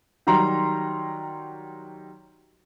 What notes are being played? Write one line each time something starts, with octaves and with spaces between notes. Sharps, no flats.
D#3 F#3 G3 A#5 C6